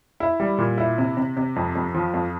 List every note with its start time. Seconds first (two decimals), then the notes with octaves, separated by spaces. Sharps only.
0.20 E4
0.40 G3
0.58 A#2
0.78 E4
0.98 C3
1.17 C3
1.37 C3
1.56 F2
1.75 F2
1.95 F3
2.14 F2